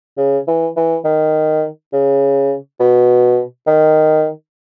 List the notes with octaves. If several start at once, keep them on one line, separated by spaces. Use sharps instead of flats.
C#3
E3
E3
D#3
C#3
B2
D#3